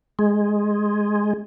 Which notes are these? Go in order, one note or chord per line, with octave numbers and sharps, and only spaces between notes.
G#3